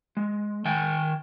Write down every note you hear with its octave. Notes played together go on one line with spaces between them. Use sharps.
G#3
D#3 G5 G#5